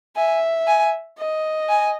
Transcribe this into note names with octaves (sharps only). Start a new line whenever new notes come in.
E5 G#5
G#5
D#5
G#5